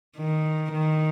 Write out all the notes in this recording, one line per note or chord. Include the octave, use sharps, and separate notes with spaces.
D#3
D#3